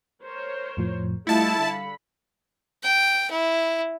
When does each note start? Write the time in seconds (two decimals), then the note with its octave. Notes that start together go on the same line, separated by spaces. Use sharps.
0.24 A#4 C5 C#5
0.77 F2 A2 F3
1.27 G3 A3 E4 F4 D#5 F5 A5 C#7
1.57 D3 B5
2.84 G5
3.31 E4